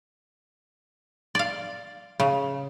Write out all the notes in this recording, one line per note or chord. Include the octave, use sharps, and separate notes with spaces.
D5 F5
C#3